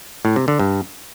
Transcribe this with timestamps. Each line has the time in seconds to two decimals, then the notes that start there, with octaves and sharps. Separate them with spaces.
0.25 A2
0.36 C3
0.48 D3
0.59 G2